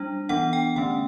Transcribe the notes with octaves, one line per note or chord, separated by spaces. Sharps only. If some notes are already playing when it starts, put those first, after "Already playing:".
Already playing: G3 D4
E3 B3 D4 F#5
G5
D3 A3 C#4 F#5